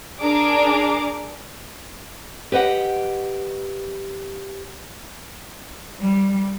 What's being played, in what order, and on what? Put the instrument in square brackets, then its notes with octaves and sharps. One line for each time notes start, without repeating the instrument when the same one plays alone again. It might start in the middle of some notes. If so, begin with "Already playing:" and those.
[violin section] D4 G#4 A#4 D6
[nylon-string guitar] G4 B4 D#5 F#5
[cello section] G3